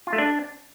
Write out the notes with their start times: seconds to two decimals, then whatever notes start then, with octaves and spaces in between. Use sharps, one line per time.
0.07 F4
0.13 A3
0.18 D4